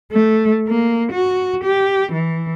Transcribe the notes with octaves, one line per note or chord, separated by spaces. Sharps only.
A3
A#3
F#4
G4
E3